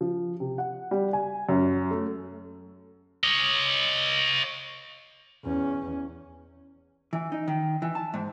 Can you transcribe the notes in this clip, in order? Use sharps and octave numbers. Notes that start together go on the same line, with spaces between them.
F3
C3
F#5
G3
G#5
F#2
A3
C#5 D#5
E2 C#4
E3
D#4
D#3
E3
A5
G#2